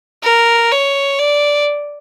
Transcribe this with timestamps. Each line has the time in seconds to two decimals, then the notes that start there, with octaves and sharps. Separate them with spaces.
0.23 A#4
0.71 C#5
1.19 D5